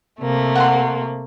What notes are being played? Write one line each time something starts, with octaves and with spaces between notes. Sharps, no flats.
C3 A3 A#3
F#5 A#5 C6